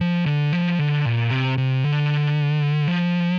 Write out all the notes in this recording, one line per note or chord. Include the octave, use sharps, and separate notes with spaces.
F3
D3
F3
D3
A#2
C3
C3
D3
F3